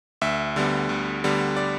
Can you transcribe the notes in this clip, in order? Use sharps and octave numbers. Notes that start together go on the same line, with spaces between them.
D2 E5
D3 G3 B3
D2
D3 G3 B3
D5